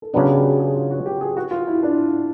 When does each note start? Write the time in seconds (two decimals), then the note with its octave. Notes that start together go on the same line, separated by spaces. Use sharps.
0.02 A4
0.13 C#3 F#3 B3 D4 G#4
0.29 G4
0.44 G#4
0.60 G#4
0.74 F4
0.90 F#4
1.06 G4
1.21 G#4
1.37 F#4
1.51 F4
1.67 E4
1.83 D4